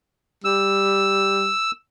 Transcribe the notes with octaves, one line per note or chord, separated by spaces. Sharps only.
G3 E6